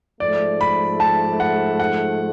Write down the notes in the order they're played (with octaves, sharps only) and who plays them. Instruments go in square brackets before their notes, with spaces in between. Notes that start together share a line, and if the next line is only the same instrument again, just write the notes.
[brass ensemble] G#2 F3 A3 [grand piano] D5
[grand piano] B5
A5
F#5
F#5